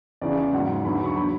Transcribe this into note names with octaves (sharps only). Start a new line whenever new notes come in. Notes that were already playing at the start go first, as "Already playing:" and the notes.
E2 C#3 E3 D5
G#2 F#3 F#5
E2 D3 F#3 B5
B5
C#6
D3 F#3 B5